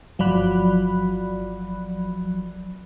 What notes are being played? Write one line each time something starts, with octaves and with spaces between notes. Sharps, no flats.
G1 F3 F#3 D5 B5 F#6